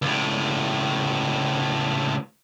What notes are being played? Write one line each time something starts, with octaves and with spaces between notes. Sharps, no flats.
C#2 A2